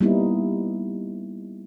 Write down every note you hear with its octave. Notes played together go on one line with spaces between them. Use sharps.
G3 A#3 B3 D#4 E4